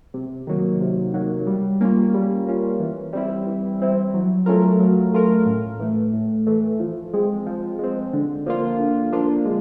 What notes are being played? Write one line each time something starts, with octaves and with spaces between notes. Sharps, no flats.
C3
D#3 F#3 A#3
C3
D#3 F#3 A#3
G3
A#3 C#4 F4
G3
A#3 C#4 F4
E3
G3 C4 E4
E3
G3 C4 E4
F#3
A3 C#4 F4 A#4
F#3
A3 C#4 F4 A#4
A2
E3 A3
A2
E3 A3
F3
G#3 C4
F3
G#3 C4
D3
F3 A#3 D4 F4
D3
F3 A#3 D4 F4
G#3